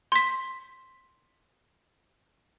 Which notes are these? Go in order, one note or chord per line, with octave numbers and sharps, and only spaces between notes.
C6 B6